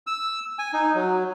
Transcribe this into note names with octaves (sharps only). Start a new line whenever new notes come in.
E6
G#5
D#4
F#3